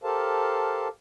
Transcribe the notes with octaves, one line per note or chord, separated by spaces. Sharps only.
G4 A4 A#4 C5 F5 A5